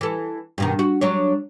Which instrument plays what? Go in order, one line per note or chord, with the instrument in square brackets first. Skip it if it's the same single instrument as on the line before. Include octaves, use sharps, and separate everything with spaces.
[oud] E3 A4
G2 B2 D#3
F#4
F#3 D4 C#5